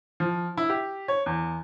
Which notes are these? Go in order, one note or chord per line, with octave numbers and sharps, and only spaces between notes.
F3
E4
G4
C#5
E2